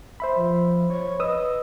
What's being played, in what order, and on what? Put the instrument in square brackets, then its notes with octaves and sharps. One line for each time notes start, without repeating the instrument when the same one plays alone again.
[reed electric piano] C5 E5 B5
[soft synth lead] F3
C#5
[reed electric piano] B4 D#6 E6 [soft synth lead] D#5